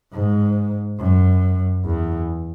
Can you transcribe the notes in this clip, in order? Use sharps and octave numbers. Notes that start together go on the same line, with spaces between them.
G#2
F#2
E2